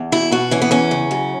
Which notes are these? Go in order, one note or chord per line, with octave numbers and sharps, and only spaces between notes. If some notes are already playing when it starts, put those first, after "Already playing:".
Already playing: E2
B2 E4
B2 F#4
E3 C#4
B3
E2 C#4
C#3
F#2